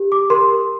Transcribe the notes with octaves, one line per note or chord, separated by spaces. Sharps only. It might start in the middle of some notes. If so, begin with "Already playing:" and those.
Already playing: G4
D6
A#4 C6